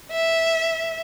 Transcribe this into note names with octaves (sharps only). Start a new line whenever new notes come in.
E5